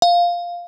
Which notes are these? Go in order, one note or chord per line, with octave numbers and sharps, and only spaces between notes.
F5